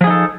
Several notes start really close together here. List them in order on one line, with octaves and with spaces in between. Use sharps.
F3 G#4 D#4 A4